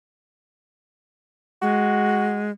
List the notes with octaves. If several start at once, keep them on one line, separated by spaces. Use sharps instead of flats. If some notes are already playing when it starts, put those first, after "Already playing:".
G#3 F#4